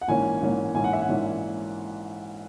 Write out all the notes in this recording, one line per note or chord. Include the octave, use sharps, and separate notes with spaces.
F#5
A#1 G#2 E3 A#3 C#4 G#5
A#1 G#2 E3 A#3 C#4
A#1 G#2 E3 A#3 C#4 G#5
F#5
E5
F#5
A#1 G#2 E3 A#3 C#4